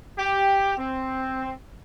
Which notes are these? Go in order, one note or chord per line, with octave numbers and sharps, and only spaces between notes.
G4
C4